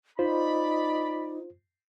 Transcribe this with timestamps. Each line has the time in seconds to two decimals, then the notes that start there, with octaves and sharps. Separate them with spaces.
0.19 D#4 F4 C5 D5 B5